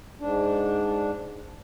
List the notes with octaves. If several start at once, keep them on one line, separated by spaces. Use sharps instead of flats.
G#2 D4